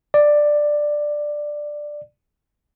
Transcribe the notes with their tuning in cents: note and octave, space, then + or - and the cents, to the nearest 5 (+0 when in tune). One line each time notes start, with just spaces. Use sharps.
D5 +10